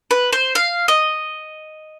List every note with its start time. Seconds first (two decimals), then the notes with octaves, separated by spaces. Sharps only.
0.11 B4
0.33 C5
0.55 F5
0.88 D#5